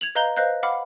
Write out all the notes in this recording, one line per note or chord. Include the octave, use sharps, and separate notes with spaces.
G#6 F7 F#7
B4 D#5 F5 A#5 G6 G7
B4 C5 D#5 F5 F#6 G6
F5 F#5 B5 D6 F6